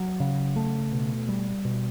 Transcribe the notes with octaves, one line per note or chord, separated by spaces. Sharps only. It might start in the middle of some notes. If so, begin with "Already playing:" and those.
Already playing: F#3
C#3
A3
B2
G3
B2